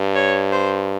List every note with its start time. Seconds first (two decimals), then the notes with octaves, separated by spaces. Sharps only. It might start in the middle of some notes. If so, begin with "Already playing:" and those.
Already playing: G2
0.15 C#5
0.52 C5